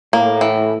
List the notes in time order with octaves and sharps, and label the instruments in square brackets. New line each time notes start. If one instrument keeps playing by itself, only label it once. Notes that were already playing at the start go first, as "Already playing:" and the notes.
[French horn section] A2 [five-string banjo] A#3
[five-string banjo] E3